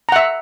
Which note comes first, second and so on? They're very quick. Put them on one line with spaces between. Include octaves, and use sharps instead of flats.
A#5 F#5 E5